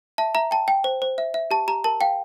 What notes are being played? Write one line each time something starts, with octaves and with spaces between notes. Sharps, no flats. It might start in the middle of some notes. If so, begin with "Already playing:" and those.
E5 A5
E5 A#5
G5 A5
G5
C5
C5
E5
E5
G4 A5
G4 A#5
A#4 A5
F5 G5